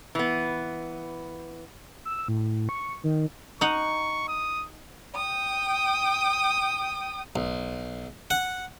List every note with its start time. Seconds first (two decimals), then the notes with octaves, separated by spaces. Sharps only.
0.15 E3 B3
2.05 E6
2.28 A2
2.69 C#6
3.04 D#3
3.61 D#4 F#5 C#6
4.28 D#6
5.14 G5 D#6
7.36 B1
8.30 F#5